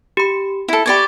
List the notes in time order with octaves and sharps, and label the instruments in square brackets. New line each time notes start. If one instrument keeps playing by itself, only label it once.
[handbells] G4 B5
[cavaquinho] E4 A4
[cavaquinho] G4 D5 C#6 [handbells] B5 G#6